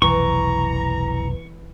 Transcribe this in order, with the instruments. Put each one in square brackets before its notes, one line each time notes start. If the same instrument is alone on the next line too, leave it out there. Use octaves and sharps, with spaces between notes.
[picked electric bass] F1 B1 [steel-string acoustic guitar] E3 [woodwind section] A#5 [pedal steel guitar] C#6